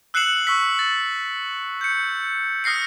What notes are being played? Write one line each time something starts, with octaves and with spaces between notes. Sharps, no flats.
E6 F#6 C7 C#7 E7 F#7
C#6 E6 B6
A6
G6 C#7
D#6 F6 A#6 C7 C#7